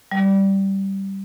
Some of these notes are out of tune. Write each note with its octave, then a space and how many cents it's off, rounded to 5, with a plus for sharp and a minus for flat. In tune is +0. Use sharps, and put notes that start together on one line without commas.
G3 -10